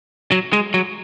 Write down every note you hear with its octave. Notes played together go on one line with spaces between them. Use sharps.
F#3
G#3
F#3